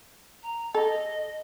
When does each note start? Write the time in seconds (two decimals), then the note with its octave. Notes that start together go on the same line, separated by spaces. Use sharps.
0.43 A#5
0.75 A4 D#5